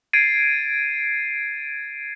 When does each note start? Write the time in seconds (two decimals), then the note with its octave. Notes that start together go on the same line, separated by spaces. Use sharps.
0.13 G#6 A6 C7 D7 D#7